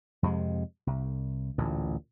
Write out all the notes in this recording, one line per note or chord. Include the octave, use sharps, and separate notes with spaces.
F2 C3 G#3
C2
A1 D2 A#2